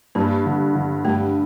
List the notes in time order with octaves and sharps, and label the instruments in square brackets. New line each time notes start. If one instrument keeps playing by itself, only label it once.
[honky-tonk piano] G2 [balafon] A#3
[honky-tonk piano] D3
D3
[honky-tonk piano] G2 [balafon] A3